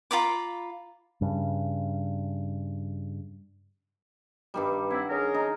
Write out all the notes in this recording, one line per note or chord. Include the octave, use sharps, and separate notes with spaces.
F4 A#5 B5 D6
G2 C#3
G2 D#3 G3
C4 E4 F#5
C#4 G#4 A#4
D#4